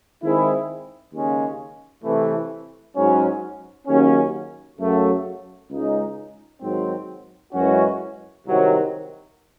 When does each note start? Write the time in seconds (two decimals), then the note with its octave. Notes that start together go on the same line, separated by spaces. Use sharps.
0.20 D#3 G#3 C4 E4 G#4
1.12 D#2 C#3 G#3 C#4
2.04 C3 E3 A3
2.96 G#2 F#3 C#4
3.87 D#2 C#3 F#3 C#4
4.79 F#2 C#3 F#3 A3
5.70 C#2 C#3 G#3 D#4
6.61 G#2 D#3 F#3 C4
7.53 F#2 E3 G#3 C#4 F#4
8.45 C2 C3 D#3 F#3